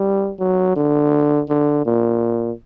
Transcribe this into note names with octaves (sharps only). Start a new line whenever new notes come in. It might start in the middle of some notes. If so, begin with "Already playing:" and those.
Already playing: G3
F#3
D3
D3
A#2